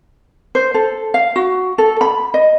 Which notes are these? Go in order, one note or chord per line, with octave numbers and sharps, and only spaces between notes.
C5
A4
F5
F#4
A4
B5
D#5